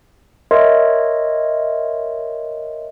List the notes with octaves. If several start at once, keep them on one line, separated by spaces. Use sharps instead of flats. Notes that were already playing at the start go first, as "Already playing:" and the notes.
A#4 C#5 D#5 E5 C6